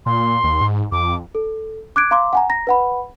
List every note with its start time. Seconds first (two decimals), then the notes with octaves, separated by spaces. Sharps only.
0.06 A#2 C6
0.44 D#2
0.61 G#2
0.92 F2 D6
1.35 A4
1.96 D6 F#6 G#6 D7
2.11 F5 A#5 C6 D6
2.33 F#5 G#5 A#5
2.50 A#5 A#6
2.67 B4 F#5 B5